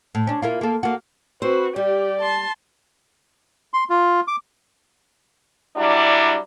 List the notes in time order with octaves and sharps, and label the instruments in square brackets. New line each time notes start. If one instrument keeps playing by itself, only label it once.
[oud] A2
C#4 D4
A#3 E4 F4
A#3 A4
A#3 F#4
[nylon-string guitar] C4 C5 [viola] F#4 [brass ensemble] B4
[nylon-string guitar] G3 [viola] G4 [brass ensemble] D5
[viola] A5 C6
[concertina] C6
F4
D6
[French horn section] F#3 G3 D4 E4